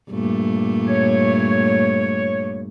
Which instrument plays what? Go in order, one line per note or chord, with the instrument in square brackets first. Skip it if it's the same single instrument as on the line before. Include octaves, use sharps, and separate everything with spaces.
[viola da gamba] G2 A#2 A3
[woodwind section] C#5